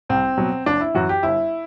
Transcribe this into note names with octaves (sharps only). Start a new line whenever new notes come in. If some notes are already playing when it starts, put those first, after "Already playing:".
C2 C4
B2 F#3
F#1 D4
E4
F#2 E3 F#4
G4
G1 E4